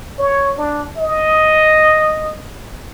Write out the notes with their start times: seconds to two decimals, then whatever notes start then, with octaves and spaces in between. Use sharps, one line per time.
0.18 C#5
0.58 D4
0.97 D#5